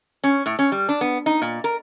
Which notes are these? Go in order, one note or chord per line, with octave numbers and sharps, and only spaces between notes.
C#4
A2
C#4
G3
D4
B3
D#4
A#2
A#4